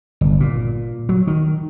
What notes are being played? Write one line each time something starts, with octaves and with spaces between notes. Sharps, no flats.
G1
A#2
F#3
D#3